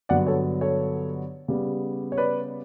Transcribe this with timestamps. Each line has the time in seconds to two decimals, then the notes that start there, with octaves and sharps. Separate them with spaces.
0.09 G2 D3 F#3 B3 D5 F#5
0.27 A4 C#5
0.61 A4 C#5
1.48 C#3 G3 B3
2.12 C#5
2.18 B4 D5